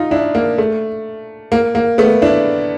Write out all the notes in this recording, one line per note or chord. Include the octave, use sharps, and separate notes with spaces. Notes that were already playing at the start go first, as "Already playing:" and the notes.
Already playing: D#4 F4
D4 E4
A#3
A3
A#3
A#3
A3 B3
D4 E4